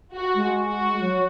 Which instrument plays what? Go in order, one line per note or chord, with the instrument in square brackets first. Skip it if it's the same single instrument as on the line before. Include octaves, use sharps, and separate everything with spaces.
[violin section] F#4
[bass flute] G#3
[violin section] F#4
[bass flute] F#3